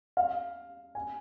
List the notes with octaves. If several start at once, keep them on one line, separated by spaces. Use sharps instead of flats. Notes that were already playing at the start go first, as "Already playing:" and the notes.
F5
G#5